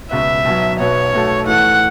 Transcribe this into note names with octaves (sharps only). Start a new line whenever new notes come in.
C#2 B2 B3 F#4 B4 E5
B1 B2 F#3
B1 B2 B3 F#4 C#5
B1 B2 A3 F#4 A4
A2 E3 A3 E4 A4 F#5